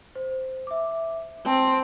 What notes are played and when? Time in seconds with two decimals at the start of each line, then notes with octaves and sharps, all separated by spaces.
0.16 C5
0.67 E5 D6
1.46 C4 A5